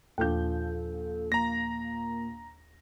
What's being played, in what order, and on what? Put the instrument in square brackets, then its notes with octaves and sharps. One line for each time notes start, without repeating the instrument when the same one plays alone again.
[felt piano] A#1 F3 G6 [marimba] D#2 D4 [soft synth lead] A4
[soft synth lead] A#3 [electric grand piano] A#5 A#6